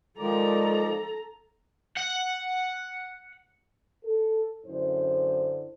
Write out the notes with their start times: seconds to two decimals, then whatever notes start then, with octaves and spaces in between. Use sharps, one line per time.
0.19 D#3 F3 G#3 A4 D5 A#5
1.97 F#5
4.05 A4
4.66 F#2 D3 E4 C5